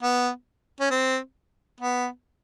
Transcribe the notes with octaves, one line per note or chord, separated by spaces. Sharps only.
B3
C#4
C4
B3